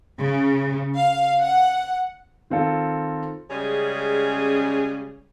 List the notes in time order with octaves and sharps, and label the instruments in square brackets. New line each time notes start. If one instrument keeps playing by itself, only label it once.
[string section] C#3
F5
F#5
[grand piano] D#3 C4 F4 A4
[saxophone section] C#3 G3 G#3 C#4 G#4